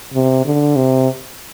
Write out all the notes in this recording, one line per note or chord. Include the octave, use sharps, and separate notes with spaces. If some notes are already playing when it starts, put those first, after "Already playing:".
C3
D3
C3